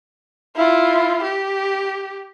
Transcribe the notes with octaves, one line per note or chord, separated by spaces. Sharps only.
E4 F4
G4